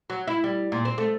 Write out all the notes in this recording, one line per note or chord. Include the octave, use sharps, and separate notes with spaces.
F#3
E4
G3
A#2
C4
A3